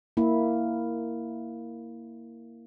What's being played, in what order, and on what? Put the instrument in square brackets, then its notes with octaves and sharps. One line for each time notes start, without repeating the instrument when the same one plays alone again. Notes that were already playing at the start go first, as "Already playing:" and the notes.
[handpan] A#3 E4